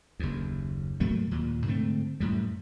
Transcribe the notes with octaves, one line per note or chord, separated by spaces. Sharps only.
F#1 D#2
G#2 F#3 A3 A#3
D#2 A#2
G#2 D3 A3 C4
F#2 A2 G3